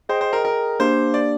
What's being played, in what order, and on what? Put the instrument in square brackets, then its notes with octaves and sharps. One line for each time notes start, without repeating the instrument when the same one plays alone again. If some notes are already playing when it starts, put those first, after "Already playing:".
[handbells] G#4 D#5 G5 [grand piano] C5
[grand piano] C5
A#4
A#4
[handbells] A#3 D4 G4 [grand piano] C5
[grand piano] D5